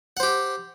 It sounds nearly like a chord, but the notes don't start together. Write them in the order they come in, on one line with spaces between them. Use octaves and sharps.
F#5 C5 G4